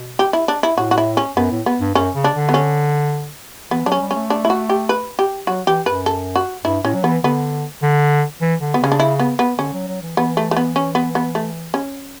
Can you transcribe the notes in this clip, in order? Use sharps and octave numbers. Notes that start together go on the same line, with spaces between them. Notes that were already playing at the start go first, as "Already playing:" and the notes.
Already playing: B2
G4
E4
D4
E4
A2 F#4
F#4
E4
C#4
F#2 B3
A2
B3
G2
F#2 C#4
C#3
D4
D3
B3
C#4
E3 B3
F#3 D4
C#4
G3
C#4
A3
D4
E4
F#4
G4
B4
G4
F#3 F#4
E3 G4
F#2 B4
A4
F#4
G2 E4
A2 C#4
F#3
E3 B3
D3 B3
D3
E3
D3
B3
C#3 C#4
D4
E4
B3
B3
D3 C#4
F#3
F#3
E3
E3 B3
A3
A3
B3
C#4
B3
B3
A3
C#4